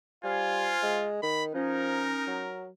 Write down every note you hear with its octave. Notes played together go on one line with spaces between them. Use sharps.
G3 F4 C5 F5 G#5
G#3
D#3 B5
F3 C#4 D#4 A#4
F#3